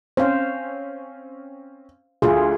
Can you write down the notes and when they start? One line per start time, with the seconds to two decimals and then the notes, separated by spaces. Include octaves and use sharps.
0.17 C4 C#4 C5 F5
2.22 D2 F4 G#4